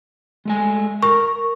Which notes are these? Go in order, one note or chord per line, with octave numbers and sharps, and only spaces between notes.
G#3 A3 G#5
A#4 C#6